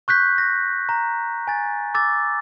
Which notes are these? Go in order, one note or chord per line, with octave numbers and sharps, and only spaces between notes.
C#6 F#6 G6 B6
A#6
A#5
G#5 A6
D6 E6 A6